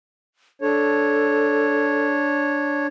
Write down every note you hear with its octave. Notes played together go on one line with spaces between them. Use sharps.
D4 A4 C#5